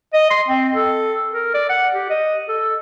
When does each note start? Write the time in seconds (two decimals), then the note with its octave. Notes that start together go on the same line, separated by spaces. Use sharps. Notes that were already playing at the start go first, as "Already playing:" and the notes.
0.14 D#5
0.30 C6
0.48 C4
0.75 A4
1.33 A#4
1.54 D5
1.69 F#5
1.94 G4
2.10 D#5
2.48 A4